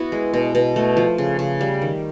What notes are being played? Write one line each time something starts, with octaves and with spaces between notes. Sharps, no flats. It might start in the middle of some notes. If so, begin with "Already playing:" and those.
Already playing: B3 E4 F#4
G#3
B2
B2
A3
F3
C#3
C#3
G3
D#3